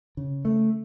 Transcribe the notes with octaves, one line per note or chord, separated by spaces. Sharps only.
C#3
A3